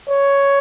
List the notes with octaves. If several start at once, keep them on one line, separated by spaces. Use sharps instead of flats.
C#5